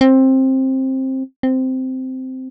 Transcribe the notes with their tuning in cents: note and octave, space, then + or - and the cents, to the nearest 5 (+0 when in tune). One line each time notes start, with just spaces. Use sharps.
C4 +15
C4 -10